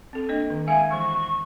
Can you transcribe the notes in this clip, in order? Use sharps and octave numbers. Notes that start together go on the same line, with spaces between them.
C4 A4
A#3 D4 D#5
D#3
G#3 E5 F5 G#5
E3 G#3 C#6